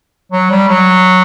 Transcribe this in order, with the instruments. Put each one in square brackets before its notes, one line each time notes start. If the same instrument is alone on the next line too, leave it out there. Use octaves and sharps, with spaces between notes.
[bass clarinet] F#3
G3
F#3